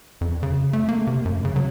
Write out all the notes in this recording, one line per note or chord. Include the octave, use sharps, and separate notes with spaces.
F2
C#3
A3
A#3
C3
F#2
C#3
F#3